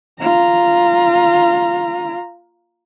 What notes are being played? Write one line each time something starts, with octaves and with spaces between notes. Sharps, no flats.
F4 A#5